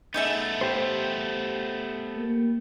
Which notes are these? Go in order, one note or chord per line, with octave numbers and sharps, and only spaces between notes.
A3 B3 D#4 G#4 E5
G4 C5
A#3